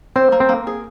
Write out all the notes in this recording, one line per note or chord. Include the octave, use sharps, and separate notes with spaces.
C4 C5
A#3
C4
A#3
G#4